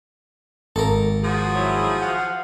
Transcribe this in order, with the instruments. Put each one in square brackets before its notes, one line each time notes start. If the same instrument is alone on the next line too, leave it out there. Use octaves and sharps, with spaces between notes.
[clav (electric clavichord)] G#1 [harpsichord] A4 A#4
[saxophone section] F3 F#4 G#4
[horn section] F#3 E4
F5 F#5